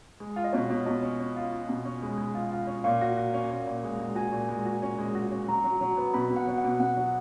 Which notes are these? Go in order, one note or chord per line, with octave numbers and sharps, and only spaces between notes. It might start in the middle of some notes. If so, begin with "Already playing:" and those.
G#3
F4
D#5
B2 C#5
B2
B2 D#5
C#4
C#4
F4
F4
B2
C#4
G#3
G#3
F4
F4
C#4
A#2 F5
F#4
F#4
C#4
A#2
A#2
G#3
G#3
F#4 G#5
A#2
G#3
F#4
C#4
G#3
F#4
C#4
F#3 A#5
F#3
F#3
B3
B2 B5
B2
F#5
F#3
F#5
B2
B2 F#5
F#3